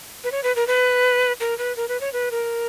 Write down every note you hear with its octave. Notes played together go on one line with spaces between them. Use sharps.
B4
C#5
B4
A#4
B4
A#4
B4
A#4
B4
C#5
B4
A#4